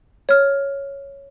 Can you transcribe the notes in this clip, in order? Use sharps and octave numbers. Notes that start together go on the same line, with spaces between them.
C#5 F6